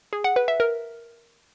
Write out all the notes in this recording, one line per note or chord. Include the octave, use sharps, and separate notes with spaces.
G#4
F#5
B4
E5
A#4